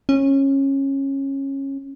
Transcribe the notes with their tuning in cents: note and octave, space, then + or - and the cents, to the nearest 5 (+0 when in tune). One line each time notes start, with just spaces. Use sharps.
C#4 -20